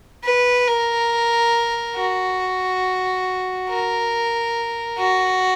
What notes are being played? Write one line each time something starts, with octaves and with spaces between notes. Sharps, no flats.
B4
A#4
F#4
A#4
F#4